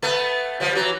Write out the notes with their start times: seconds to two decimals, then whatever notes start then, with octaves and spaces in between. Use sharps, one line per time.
0.02 A3 B3
0.60 F3 G3
0.75 E3 F#3